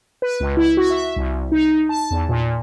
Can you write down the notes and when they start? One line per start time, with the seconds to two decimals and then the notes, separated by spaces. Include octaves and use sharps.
0.22 B4
0.40 C#2
0.57 E4
0.77 F#4
0.90 E5
1.16 C2
1.52 D#4
1.89 A5
2.11 E2
2.29 A#2